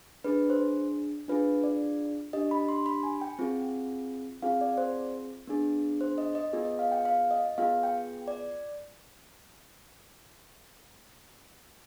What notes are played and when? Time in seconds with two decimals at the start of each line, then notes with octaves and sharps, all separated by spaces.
0.25 D4 G#4 B4
0.50 C5
1.28 D4 F4 G#4 B4
1.64 D5
2.33 D4 G4 D#5
2.51 B5
2.69 C6
2.86 B5
3.03 G#5
3.21 G5
3.39 C4 F4 G#4
4.42 C4 F4 G#4 F5
4.61 D5
4.78 C5
5.47 B3 D4 G#4
6.01 C5
6.18 D#5
6.35 D#5
6.53 B3 F4 G#4
6.65 D#5
6.79 F5
6.92 G5
7.05 F5
7.31 D#5
7.58 B3 F4 G#4 F5
7.83 G5
8.28 D5